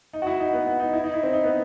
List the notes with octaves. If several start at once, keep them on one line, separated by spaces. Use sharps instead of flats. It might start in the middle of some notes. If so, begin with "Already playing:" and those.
D#4
F#4
E4
D#4
B3
B3
D#4
E4
D#4
E4
C4
D#4
B3